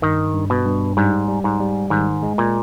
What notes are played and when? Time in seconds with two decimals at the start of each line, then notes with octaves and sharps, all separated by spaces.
0.02 G2 D#3
0.34 G2
0.50 B2
0.65 G2
0.97 G#2 G3
1.28 G3
1.44 G#2
1.60 G3
1.90 G#2 D#3
2.23 G#3
2.38 A#2